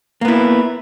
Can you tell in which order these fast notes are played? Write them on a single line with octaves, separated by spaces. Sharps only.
A#3 B3 E4